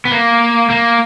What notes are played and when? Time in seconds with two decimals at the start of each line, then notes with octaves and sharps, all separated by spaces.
0.05 B3
0.11 A#3
0.70 A#3